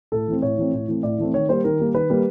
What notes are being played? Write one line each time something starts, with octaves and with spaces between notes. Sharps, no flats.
A2 A4
E3 A3 C4
A2 C#5
E3 A3 C4
A2
E3 A3 C4
A2 D5
E3 A3 C4
D#3 C#5
G3 A#3 C5
D#3 A#4
G3 A#3
D#3 B4
G3 A#3